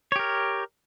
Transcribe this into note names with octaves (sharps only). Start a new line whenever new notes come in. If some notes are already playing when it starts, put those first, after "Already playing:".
G4 A#4 C#5